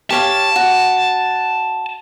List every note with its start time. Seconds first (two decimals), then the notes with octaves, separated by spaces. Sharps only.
0.10 G4 C#5 F5 A5
0.56 F#4